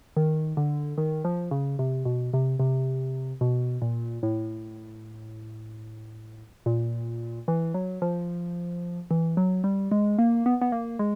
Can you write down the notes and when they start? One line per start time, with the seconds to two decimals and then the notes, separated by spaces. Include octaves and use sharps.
0.17 D#3
0.57 D3
0.98 D#3
1.25 F3
1.51 C#3
1.79 C3
2.05 B2
2.33 C3
2.60 C3
3.41 B2
3.82 A#2
4.23 A2
6.66 A#2
7.48 E3
7.74 F#3
8.02 F3
9.11 E3
9.37 F#3
9.64 G3
9.91 G#3
10.18 A#3
10.46 B3
10.61 B3
10.72 A#3
10.99 G#3